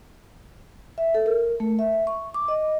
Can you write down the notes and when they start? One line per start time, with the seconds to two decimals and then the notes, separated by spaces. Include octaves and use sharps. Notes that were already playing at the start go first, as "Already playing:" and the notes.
0.98 E5
1.14 A4
1.26 A#4
1.60 A3
1.79 E5
2.07 C#6
2.34 D6
2.48 D#5